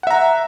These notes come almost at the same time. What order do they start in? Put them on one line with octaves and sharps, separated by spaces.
F#5 E5 A#5